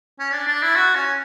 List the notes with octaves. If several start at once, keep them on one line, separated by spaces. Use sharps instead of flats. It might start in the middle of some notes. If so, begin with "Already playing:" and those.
C#4
D4
D4
E4
F#4
C#4